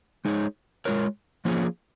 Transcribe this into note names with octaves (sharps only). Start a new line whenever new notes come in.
G#3 D#4 G#4 C#5
G#3 F4 A#4 C#5
F3 A#3 C#4 F4 G#4